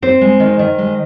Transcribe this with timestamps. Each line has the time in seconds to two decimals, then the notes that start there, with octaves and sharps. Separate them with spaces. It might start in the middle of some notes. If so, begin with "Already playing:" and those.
0.02 C4 C5
0.21 G#3
0.40 D#3
0.59 D#3
0.78 G#3